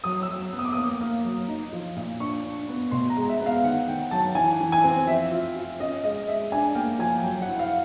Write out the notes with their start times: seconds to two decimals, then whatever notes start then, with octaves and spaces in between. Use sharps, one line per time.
0.04 F#3 D#6
0.22 E6
0.29 F#3
0.53 B3
0.59 D#6
0.65 D6
0.73 A#3 D#6
1.01 A#3
1.25 F#3
1.48 D#4
1.73 F3
1.97 A#2
2.20 D4 C#6
2.45 D4
2.69 B3
2.91 B2 C6
3.10 A#5
3.17 G#3
3.28 E5
3.40 B3
3.46 F5
3.63 D#3 F#5
3.88 D#3 G5
4.11 F#3 A5
4.35 E3 G#5
4.60 E3
4.72 G#5
4.84 C4
5.07 F3 E5
5.31 F4
5.56 F4
5.79 C#4 D#5
6.04 G#3 D#5
6.28 G#3 E5
6.52 D4 G#5
6.75 A#3 G5
6.99 F3 G#5
7.23 F#3 G5
7.42 F#5
7.48 E4
7.59 F5